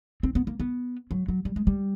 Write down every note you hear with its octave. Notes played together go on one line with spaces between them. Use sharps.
C4
B3
A#3
B3
F#3
F#3
G3
G#3
G3